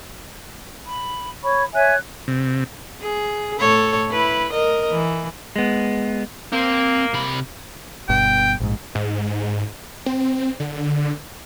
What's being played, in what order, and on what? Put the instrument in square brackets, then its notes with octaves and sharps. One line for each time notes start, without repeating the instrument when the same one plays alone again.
[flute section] B5
[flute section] C#5 C#6 [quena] B5
[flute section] C#5 E5 G#5 [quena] F#6
[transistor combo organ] C3
[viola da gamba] G#4
A2 A4 C#5
E4 B4
A#4 D#5
E3
[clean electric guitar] G#3 B3
[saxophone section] A#3 [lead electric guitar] C4
[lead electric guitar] C3 B5
[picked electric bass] G1 G2 B2 [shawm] G5
[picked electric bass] A#1 G#2
[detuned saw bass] G#2
C4
D3